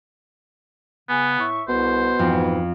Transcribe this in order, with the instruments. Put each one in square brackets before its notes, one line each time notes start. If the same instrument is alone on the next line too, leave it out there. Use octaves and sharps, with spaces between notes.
[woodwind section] C#3 G#5 [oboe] B3
[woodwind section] A2 E5 C#6
[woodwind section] C2 [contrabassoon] B2 [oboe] C5
[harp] F2 [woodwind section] G#2 E3